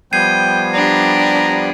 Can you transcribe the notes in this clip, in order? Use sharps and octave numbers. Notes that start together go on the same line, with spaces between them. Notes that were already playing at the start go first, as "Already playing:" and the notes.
F3 G3 B3 G5 G#6 C7 D#7
D4 G4 A#5